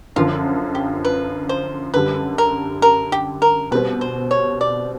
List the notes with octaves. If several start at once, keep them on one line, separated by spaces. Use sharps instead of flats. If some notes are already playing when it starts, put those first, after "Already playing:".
F#2 D3 F3 F4
G4
B4
C5
F#2 D3 G3 B4
A#4
A#4
G4
A#4
B2 G3 C4 B4
C5
C#5
D5